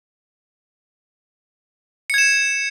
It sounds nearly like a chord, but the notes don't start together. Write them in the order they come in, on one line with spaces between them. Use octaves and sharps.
C#7 G#6 E7